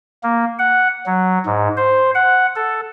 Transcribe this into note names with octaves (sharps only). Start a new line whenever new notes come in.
A#3
F#5
F#3
G#2
C5
F#5
A4